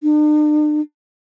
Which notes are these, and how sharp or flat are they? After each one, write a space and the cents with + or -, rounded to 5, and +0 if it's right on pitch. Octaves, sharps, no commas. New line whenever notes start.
D4 +45